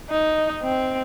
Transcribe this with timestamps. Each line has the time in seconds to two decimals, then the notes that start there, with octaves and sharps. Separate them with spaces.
0.10 D#4
0.63 C4